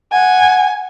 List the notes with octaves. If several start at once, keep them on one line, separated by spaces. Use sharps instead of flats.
F#5 G#5